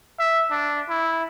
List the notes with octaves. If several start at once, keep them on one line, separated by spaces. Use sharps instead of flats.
E5
D4
E4